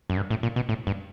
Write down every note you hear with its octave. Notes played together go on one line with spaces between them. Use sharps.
F#2
G2
A2
A#2
B2
A2
G2